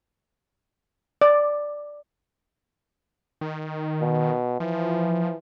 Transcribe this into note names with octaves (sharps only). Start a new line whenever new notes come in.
D5
D#3
B2
E3 F3